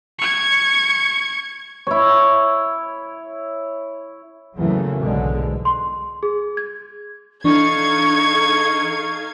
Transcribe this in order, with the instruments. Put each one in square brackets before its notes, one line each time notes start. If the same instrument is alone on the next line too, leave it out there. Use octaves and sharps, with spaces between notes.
[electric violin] C#6 G#6
[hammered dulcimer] E4 C#5
[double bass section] E2 C#3 E3 F#3 A3 A#3
B1 G#2 B2 D3 G#3
[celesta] C6
G#4
G#6
[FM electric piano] E3 D4 [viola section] D#4 A4 F5 [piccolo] C#6 [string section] G#6